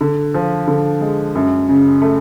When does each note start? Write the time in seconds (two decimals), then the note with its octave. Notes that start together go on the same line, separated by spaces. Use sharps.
0.01 D3
0.34 F3
0.67 D3
1.01 G#3
1.35 F#2
1.69 C#3
2.02 A3